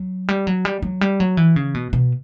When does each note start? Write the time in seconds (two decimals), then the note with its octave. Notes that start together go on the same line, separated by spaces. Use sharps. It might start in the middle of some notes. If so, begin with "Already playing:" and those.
Already playing: F#3
0.28 G3
0.47 F#3
0.65 G3
0.82 F#3
1.01 G3
1.20 F#3
1.37 E3
1.56 C#3
1.74 B2
1.93 B2